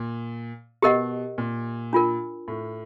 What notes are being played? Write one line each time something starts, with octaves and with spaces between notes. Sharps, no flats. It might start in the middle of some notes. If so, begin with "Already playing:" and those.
Already playing: A#2
B2 G4 A#4 D#5 F#5
A#2
D4 F4 A#4
A2